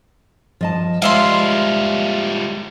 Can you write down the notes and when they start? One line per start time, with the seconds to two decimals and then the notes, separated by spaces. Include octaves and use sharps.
0.61 F3 D#5 A5
1.02 F3 G3 G#3 F4 E5 C6